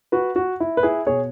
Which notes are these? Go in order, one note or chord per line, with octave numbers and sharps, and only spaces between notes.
F#4 B4
F#4
E4
B4
E4 G#4
B2 G#4 C#5